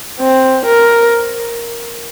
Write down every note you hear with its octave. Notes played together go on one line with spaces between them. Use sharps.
C4
A#4